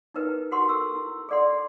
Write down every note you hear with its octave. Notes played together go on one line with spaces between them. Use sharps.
D#4 E4 A#4 B4 G5
F#4 G4 A#4 F#5 C6 C#6
A4 A#4 E6
E4
G#4 A4 D5 F#5 C6